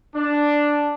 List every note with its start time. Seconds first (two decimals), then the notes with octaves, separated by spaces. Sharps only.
0.15 D4